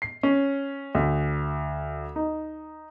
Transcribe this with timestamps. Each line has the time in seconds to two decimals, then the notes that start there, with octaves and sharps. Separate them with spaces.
0.02 C7
0.23 C#4
0.95 D2
2.16 D#4